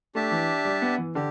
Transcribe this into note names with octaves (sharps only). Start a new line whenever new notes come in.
A3 D4 G4 E5 A5
E3
G3
B3
E3
D3 G4